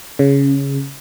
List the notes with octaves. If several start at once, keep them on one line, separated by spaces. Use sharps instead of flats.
C#3